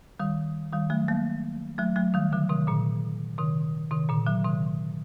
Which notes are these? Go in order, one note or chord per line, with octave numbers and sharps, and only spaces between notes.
D#3 G3
D#3 G3
F#3 A3
G3 A#3
F#3 A3
F#3 A3
D#3 G3
D3 F#3
C3 D#3
A#2 D3
C3 D#3
C3 D#3
A#2 D3
D3 F#3
C3 D#3